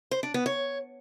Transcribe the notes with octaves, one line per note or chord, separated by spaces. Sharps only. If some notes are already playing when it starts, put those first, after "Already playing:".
C5
D4
B3
C#5